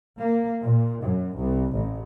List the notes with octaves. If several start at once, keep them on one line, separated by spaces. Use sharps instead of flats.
A#3
A#2
F#2
C2
A1